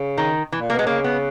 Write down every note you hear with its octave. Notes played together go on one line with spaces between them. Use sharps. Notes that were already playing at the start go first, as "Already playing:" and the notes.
Already playing: C#3
D#3
E3
A#2
A#3
B2
G#3
C#3 A#3
B3